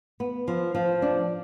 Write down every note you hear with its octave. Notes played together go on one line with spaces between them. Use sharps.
B3
F3
F3
D4